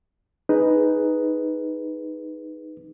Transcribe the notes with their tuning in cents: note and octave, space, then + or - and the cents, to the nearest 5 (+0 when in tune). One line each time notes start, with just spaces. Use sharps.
D#4 +0 G#4 +5 B4 +0